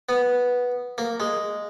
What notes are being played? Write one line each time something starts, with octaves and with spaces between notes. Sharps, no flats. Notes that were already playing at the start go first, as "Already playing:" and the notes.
B3
A#3
G#3